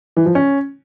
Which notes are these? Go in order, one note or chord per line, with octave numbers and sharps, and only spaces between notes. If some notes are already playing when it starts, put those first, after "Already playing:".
E3
F3
C#4